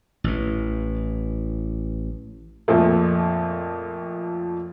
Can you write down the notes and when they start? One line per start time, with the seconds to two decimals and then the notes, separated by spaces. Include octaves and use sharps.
0.24 A1 E3
2.68 F2 A#2 F3 A3